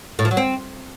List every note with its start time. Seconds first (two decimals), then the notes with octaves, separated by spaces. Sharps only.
0.19 A2
0.25 F3
0.31 F#3
0.37 C4